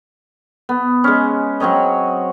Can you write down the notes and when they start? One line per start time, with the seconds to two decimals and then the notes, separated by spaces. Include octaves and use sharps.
0.69 B3
1.04 G#3 C#4
1.60 F#3 C4 C#5 D#5